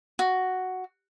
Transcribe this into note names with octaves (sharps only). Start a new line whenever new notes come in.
F#4